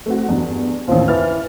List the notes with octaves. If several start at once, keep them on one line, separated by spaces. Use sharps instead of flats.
A3 C4 F#4
E2 G2
A1 D#2 F3
E3 F6 A6